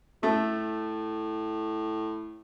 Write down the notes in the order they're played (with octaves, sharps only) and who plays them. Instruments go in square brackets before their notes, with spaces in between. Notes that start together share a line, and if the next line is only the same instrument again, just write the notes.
[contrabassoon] A2 [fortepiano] A3